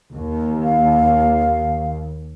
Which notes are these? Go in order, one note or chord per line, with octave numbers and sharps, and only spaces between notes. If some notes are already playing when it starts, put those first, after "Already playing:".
D#2
F5